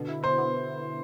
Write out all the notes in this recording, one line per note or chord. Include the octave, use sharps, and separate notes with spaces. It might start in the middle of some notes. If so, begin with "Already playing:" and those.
Already playing: B2 D3
E4
B2 C5
B3